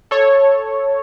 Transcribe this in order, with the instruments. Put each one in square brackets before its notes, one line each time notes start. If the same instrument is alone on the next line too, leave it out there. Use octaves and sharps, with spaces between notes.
[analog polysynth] A4 C#5